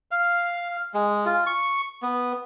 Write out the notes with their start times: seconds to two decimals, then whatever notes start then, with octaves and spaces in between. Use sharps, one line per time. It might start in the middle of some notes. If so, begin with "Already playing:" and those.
0.11 F5
0.94 G#3
1.26 F4
1.46 C#6
2.02 B3